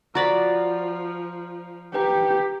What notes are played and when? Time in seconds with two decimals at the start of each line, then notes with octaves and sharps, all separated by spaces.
0.15 F3 F#4 D5 A#5 B5
1.94 G4 B4 G5 A#5